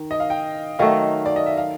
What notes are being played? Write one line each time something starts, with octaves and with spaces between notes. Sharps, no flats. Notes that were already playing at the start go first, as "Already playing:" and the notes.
Already playing: D#3
D#5
F5
G5
D#3 F#3 A3 F5
D5
D#5
E5
F5